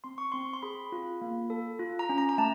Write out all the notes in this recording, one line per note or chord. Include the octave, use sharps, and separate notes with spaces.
C4 C6
C#6
C4 C6
C6
G#4 B5
F4
A#3
A4
F4
A#5
C#4
A#5
A#5
A3 A5